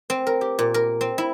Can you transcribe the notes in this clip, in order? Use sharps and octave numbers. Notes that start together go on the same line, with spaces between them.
C4
A#4
G4
A#2
A#4
C4
E4